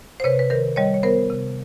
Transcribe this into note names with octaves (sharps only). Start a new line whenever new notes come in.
C5
C3 B4 C#5
B4
D#3 A#4 C5
G3 C#5 D#5
C#5
B3 A#4 C5
C3